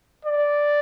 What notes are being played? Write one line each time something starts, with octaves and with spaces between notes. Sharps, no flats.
D5